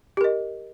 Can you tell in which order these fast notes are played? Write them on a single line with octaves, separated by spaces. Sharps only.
G4 A#4 D#5